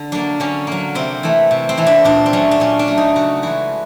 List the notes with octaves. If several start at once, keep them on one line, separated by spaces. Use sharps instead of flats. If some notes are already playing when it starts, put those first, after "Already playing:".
Already playing: D3
F#3 A#3 D4
D3 C#4
F#3 A#3
C3 C4
E3 A3
C3
C4
E3 A3
D4
A#2 D4
C4
F#3 A3 C#4
D4
A#2 C#4
D4
F#3 A3
D#4
C#3 F#4
E3 G#3 F#4